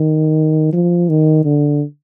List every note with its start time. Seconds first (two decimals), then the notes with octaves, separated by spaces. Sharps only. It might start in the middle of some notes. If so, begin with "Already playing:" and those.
Already playing: D#3
0.73 F3
1.09 D#3
1.45 D3